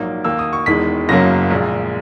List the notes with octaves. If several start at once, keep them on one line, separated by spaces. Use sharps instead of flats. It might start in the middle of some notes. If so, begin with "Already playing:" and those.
Already playing: A#1 G#2 F#3 A#3
D#2 D#3 A#3 E6
D#6
C#6
E1 E2 D#3 G#3 B6
F#1 F#2 C#3 F#3 A#3 A#6
A#1 A#2 G#3